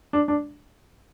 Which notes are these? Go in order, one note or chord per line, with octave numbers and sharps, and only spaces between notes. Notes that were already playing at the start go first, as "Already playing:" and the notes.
D4
D4